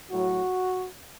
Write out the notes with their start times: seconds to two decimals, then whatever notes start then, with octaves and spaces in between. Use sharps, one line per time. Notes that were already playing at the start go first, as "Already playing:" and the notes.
0.11 A2 F#3 F#4